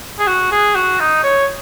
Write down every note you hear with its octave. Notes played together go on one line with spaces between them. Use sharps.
G#4
F#4
G#4
F#4
D#4
C#5